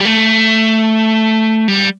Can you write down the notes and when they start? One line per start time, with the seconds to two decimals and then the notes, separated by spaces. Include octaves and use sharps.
0.01 G3
0.05 A3
1.68 G3